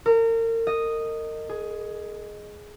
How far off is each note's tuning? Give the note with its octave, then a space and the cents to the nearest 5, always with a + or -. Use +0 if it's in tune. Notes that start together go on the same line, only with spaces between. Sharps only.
A#4 -35
D#5 -5
G#4 +10